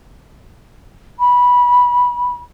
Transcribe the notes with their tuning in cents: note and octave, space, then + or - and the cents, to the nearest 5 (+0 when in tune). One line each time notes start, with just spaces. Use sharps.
B5 -15